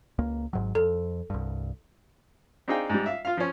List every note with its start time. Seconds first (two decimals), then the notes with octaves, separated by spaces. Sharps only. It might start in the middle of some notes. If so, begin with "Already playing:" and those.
0.19 C#2 A#3
0.53 G#1 G#2 F#3
0.75 F2 A4
1.30 C2 G2
2.68 C4 D4 D#4 G#4 F5 G5
2.89 G#2 G3
3.06 E5 F5
3.25 F4 F5
3.37 F3 C#4